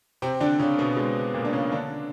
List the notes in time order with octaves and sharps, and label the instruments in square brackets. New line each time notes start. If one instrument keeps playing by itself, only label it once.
[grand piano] C3 C4
D3 D4
C#3 C#4
B2 B3
G#3
A#2 A#3
D4
C#3 C#4
D3 D4